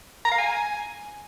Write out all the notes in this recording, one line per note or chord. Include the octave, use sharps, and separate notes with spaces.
A#5
F5
G#5